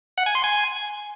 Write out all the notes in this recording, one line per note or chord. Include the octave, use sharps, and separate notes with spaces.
F#5
G#5
C6
G#5